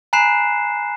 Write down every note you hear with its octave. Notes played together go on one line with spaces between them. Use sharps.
G#5 A#5 B5 F#6 C7 E7